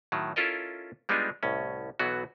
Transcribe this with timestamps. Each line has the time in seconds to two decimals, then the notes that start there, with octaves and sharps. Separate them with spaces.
0.12 A2 D#3 F#3
0.36 C#4 E4 F4 A4 A#4 D#5
1.09 G3 G#3 B3 D4 D#4 F4
1.43 C2 A2 C#4
1.99 B1 E3 F#3 B3 F#4